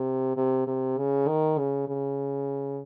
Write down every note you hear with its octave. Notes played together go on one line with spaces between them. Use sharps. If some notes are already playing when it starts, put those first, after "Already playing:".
Already playing: C3
C3
C3
C#3
D#3
C#3
C#3